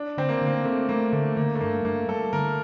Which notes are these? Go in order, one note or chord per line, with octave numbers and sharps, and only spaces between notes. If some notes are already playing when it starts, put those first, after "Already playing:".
Already playing: D4
D3 C4
A#3
D3
A#3
A3 C4
A3 A#3
D3 A3
D3 A#3
A3
G2 A#3
G2 A#3
G3 A4
D3 A#4